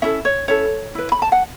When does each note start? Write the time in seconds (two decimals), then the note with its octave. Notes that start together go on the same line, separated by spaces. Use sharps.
0.02 C#4 E4 A4 E5
0.25 C#5
0.48 C#4 E4 A4 C#5
0.95 E4 B4
1.12 B5
1.22 A5
1.32 F#5